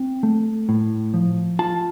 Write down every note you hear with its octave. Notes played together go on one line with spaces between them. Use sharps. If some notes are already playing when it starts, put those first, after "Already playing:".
Already playing: C4
A3
A2
F3
F4 A5